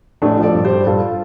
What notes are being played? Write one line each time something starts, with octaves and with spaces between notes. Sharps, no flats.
A1 A3 D4
F3
A4 D5
G2
G4 C5
G2
G2 F4 A4